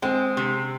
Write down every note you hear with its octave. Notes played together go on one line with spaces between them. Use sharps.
G#3 C4
C3